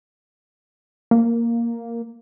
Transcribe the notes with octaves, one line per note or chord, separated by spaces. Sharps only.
A#3